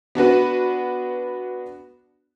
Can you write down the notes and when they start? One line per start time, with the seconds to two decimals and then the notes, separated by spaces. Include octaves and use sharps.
0.15 B3 D4 F#4 B4